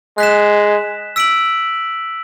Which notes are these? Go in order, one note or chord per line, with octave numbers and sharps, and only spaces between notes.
G#3 F#6 B6 E7
E6 B6 D7 F#7